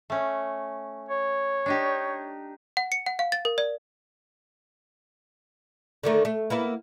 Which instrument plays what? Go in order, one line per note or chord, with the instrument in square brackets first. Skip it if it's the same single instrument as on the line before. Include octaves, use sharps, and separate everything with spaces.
[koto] A3 C#4
[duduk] C#5
[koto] D4 D#4 G4
[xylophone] F#5
C#7
F#5
F5
A6
A#4
D5
[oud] D3 D#3 A3
A3
A#3 B3 E4